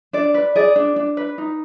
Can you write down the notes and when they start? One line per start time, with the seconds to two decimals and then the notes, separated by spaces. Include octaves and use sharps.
0.13 D4 D5
0.34 B4
0.56 G#4 D5
0.76 D4
0.96 D4
1.17 B4
1.38 D#4